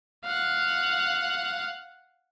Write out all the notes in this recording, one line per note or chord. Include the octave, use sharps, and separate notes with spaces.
F5 F#5